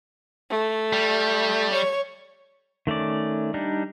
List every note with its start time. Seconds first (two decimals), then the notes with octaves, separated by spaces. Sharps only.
0.49 A3
0.93 G3
1.72 C#5
2.87 D#3 A3 C#4 D5
3.54 G3 D4 D#4